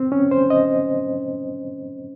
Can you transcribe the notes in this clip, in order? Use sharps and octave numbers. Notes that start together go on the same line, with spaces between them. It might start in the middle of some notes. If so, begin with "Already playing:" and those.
Already playing: C4
C#4
C5
D#5